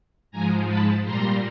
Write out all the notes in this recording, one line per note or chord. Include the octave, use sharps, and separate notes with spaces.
G#2 F3 G#3 G#5 A#5
A5 B5
A#2 G3 A#5 C6